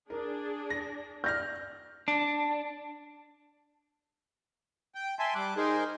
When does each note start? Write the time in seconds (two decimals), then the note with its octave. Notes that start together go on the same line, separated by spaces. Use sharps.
0.10 D4 G#4 A#4
0.70 A#6
1.24 D5 F6 G6 A#6
2.08 D4
4.95 G5
5.19 E5 G#5 A5 C6
5.35 G3 D6 F#6
5.57 D#4 G#4 A#4 C5